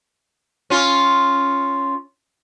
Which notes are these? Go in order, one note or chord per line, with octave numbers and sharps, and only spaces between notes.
C#4 F4